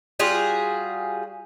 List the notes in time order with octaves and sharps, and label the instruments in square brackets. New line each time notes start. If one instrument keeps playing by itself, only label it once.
[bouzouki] G3 F4 F#4 G#4